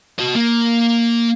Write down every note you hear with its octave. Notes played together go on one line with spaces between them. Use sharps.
F#4 D#5
A#3